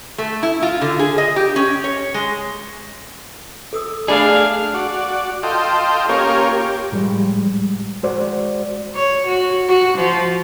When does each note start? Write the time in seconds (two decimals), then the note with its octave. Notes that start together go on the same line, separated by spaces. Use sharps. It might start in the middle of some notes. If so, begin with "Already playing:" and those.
0.18 A3
0.43 E4
0.62 F4
0.82 D3
0.99 G#4
1.18 D#5
1.36 G4
1.56 C#4
1.84 C#5
2.14 G#3
3.73 A4 D#6 E6
4.08 A3 D4 G#4 D5 F5 B5
4.74 F#4 D5
5.43 F4 A4 D#5 G5 C6
6.09 A#3 C#4 F4 G4 A#4 C#5
6.56 G4
6.92 A2 F3 G3 G#3
8.03 G#3 F#4 C5 D5
8.95 C#5
9.27 F#4
9.68 F#4
9.98 F3